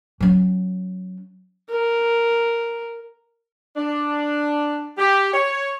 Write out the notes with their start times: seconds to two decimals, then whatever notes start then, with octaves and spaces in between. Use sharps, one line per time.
0.20 F#3 C#4
1.70 A#4
3.77 D4
4.98 G4
5.34 C#5